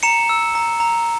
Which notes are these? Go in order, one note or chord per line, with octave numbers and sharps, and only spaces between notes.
A#5 C#7 E7
E6
A#5
A#5